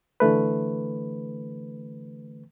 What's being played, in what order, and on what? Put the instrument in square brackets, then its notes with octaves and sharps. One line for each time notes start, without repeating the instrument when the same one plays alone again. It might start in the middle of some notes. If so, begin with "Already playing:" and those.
[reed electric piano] D3 E3 A3 B4